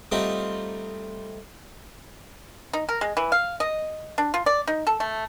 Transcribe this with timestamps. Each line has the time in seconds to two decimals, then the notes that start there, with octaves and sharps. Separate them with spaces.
0.12 G3 A3 C4 D4 D#4 F4
2.73 D#4
2.89 A#4
3.01 G#3
3.17 E3
3.32 F5
3.60 D#5
4.18 D4
4.34 F4
4.46 D5
4.67 D#4
4.87 A4
5.00 A3